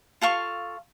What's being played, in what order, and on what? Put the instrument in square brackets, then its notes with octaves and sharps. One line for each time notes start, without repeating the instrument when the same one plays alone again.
[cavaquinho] F4 A4 F5 C#6